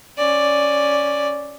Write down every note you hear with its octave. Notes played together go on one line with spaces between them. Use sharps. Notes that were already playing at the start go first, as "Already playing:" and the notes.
C#4 D5